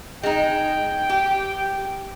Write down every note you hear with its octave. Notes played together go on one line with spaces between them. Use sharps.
G#3 D#4 G5
G4